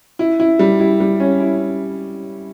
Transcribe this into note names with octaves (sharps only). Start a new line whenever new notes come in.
E4
E4
G3
E4
G3
C#4
E4